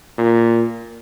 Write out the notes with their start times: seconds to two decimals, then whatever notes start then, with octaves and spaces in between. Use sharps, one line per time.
0.18 A#2